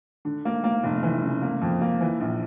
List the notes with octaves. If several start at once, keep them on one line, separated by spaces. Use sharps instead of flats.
D3
A#3
A#3
F1
E3
C#3
A#3
F2
A#3
E3
A#1